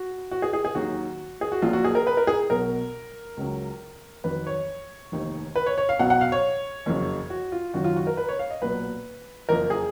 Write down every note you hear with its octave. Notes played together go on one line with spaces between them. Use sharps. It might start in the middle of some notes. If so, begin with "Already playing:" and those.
Already playing: F#4
F#4
G#4
G#4
G#4
D#2 D#3 F#3 F#4
G#4
F#4
A#1 A#2 F#3 F4
F#4
G#4
A#4
B4
A#4
G#4
B1 B2 F#3 A#4
C#2 C#3 F#3
F2 D#3 F#3 B4
C#5
F1 D#2 D#3
B4
C#5
C#5
F5
B1 B2 F#3 F#5
F#5
F5
C#5
F#1 F2 C#3 F#3
F#4
F4
F#1 F#2 D#3 F#3 F#4
F4
F#4
A#4
B4
C#5
F5
D#5
B1 A#2 F#3 B4
F#1 F2 F3 A#4
G#4